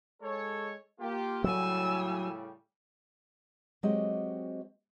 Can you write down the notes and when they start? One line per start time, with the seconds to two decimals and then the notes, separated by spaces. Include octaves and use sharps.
0.22 G#3 A4 C#5
0.99 A#3 F4 G4
1.44 A2 C#3 F#3 G3 G#5 E6
3.83 F#3 G#3 C4 F#4 G4 D#5